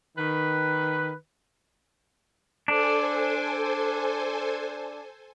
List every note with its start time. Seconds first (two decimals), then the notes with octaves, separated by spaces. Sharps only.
0.17 D#3 B4
2.68 D4 A4 C5 G#5